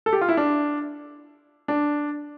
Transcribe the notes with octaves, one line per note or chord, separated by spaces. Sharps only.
A4
G4
F4
E4
D4
D4